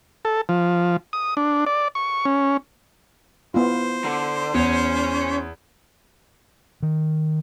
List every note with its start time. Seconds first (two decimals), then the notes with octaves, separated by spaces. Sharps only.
0.25 A4
0.49 F3
1.13 D#6
1.37 D4
1.66 D5
1.95 C#6
2.25 C#4
3.54 B3 E4 F4 C5
4.05 D3
4.54 E2 C#4
6.83 D#3